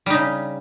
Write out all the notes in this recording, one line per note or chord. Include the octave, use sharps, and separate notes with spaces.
C#3 G3 D#4